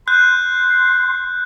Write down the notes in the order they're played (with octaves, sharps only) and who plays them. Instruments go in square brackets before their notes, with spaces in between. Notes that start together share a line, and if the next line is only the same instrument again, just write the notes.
[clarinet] C6 [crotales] F#6 G6